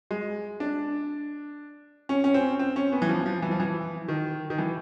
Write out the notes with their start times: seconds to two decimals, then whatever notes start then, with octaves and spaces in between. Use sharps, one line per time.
0.11 G#3
0.60 D4
2.09 C#4
2.24 C#4
2.34 C4
2.59 C4
2.76 C#4
2.92 B3
3.02 E3
3.09 F3
3.26 F3
3.42 E3
3.51 F3
3.60 E3
4.08 D#3
4.50 D#3
4.58 E3